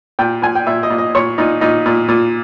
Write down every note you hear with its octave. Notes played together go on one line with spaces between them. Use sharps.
A#2 G5
A#2 G#5
G5
A#2 E5
D#5
A#2
D#5
A#2 C#5
A#2 D#4
A#2 D#4
A#2
A#2